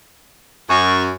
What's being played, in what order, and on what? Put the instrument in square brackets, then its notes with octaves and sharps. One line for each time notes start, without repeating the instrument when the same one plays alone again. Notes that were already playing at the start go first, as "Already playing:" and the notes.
[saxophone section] F#2 [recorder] C#6